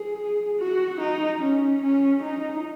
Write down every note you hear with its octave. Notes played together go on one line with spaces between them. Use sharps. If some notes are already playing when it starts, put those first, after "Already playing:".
Already playing: G#4
F#4
D#4
C#4
C#4
D#4